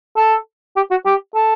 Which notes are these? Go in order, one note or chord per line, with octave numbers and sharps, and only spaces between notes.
A4
G4
F#4
G4
A4